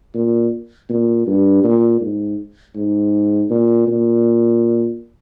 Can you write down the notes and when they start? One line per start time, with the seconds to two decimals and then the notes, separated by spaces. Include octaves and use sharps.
0.14 A#2
0.89 A#2
1.27 G2
1.64 A#2
2.01 G#2
2.75 G#2
3.50 A#2
3.87 A#2